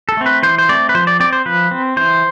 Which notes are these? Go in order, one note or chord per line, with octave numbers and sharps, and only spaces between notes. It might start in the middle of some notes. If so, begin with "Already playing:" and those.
A4
A3 C4
B4
E3 C5
C5
A3 C4 D5
B4
F3 C5
D5
C4 D5
C5
F3 B4
C4
E3 C5